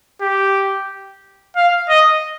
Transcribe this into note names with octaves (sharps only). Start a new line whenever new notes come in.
G4
F5
D#5